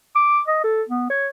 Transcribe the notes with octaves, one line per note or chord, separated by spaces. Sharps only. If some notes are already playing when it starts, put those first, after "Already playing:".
D6
D#5
A4
B3
C#5